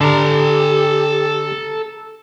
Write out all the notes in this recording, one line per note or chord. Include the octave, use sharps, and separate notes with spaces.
D3 G4 A4 A#5